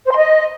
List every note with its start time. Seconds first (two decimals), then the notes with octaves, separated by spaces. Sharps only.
0.06 C5
0.11 C6
0.16 D#5